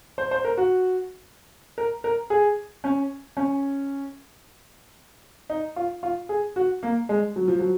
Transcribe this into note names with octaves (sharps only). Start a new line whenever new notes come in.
C5
C5
A#4
F#4
A#4
A#4
G#4
C#4
C#4
D#4
F4
F4
G#4
F#4
A#3
G#3
F#3
F3
F#3